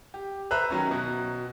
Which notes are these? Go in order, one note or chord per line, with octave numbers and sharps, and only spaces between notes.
G4
B4 C5 E5 A#5 F#6
D#3 F#3 C#4
B2